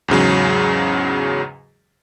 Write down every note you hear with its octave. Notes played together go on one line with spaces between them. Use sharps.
E2 G#2 C#3 F#3